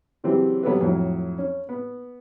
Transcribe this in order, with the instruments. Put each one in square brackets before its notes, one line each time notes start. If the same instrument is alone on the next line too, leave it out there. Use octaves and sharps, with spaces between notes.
[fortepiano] C#3 E3 F#3 C4 G4
F#3 B3 G4 A4 B4
F2 A2 F#3
C#4
B3